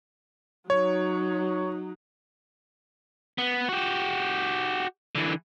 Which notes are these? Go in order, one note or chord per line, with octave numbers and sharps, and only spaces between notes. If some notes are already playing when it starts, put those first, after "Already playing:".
F#3 D#4 C#5
B3
F#4 G4
D3 E3